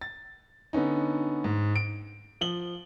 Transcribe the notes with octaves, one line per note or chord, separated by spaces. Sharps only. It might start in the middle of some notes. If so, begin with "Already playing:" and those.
A6
D3 B3 C#4 D#4
G#2
D7
F3 F#7 G7